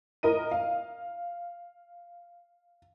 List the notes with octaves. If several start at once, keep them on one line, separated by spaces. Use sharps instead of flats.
A2 A#4 D#5 D#7
F5